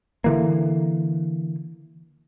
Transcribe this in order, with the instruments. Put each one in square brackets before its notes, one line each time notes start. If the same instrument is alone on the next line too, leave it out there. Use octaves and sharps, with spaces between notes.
[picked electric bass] D3 E3 A#3